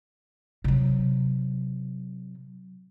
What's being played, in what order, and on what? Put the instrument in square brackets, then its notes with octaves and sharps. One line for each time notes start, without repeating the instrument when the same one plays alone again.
[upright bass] C3 F#3